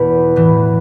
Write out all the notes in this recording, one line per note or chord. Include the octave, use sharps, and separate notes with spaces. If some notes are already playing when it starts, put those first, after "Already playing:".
Already playing: E2 B2 B4
A2 E3